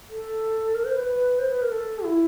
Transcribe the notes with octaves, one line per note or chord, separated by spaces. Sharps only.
A4
A#4
C5
B4
B4
C5
B4
A#4
A4
E4